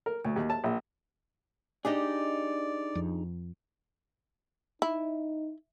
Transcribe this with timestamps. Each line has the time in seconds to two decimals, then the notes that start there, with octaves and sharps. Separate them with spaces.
0.06 A#4
0.25 D2
0.36 D#2
0.50 A5
0.64 A#1
1.85 D4 D#4 G4 G#4 D5 D#5
2.95 F2
4.82 D#4 E4